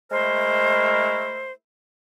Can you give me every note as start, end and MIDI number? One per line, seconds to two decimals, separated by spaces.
0.12 1.53 56
0.12 1.53 57
0.12 1.53 64
0.12 1.53 70
0.12 1.53 72